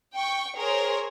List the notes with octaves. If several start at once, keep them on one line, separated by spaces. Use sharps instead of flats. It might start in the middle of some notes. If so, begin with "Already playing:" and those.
G5 C#6
G#4 A#4 C5 C#5